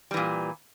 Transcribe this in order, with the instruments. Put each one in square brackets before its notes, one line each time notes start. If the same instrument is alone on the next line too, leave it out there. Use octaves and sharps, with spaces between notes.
[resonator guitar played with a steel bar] G3
E3
A#2